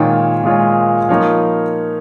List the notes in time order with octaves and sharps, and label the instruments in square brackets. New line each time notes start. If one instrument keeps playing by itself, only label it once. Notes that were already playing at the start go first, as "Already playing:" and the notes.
Already playing: [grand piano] A#2 G#3 F4 C#5 [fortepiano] D#3
[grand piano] A#2 G#3 F4 C#5
[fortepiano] F3 [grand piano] A#3 D#4 C#5 F5